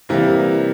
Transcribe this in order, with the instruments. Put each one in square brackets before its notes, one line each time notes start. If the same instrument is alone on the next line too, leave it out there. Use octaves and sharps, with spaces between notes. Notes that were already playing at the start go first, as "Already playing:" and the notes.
[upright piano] C3 E3 G3 A#3